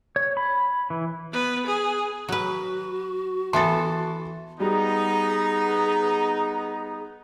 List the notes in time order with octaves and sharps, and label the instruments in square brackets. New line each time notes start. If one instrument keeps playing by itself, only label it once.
[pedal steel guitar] C#5
B5
E3
[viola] B3 B4
G#4
[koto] F#3 B4 [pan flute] F#4
[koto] E3 B3 A4 [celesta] E5 A5 [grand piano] C6 A6
[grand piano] G3 [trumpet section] B3 D#4 [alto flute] G#4 [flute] A#5